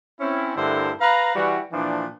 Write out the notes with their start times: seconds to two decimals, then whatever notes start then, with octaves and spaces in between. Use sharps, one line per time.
0.21 C4 C#4 E4
0.56 G2 D3 A3 E4 A#4 C5
1.01 B4 F5 A#5
1.35 E3 G3 F#4
1.72 A#2 E3 F3 D4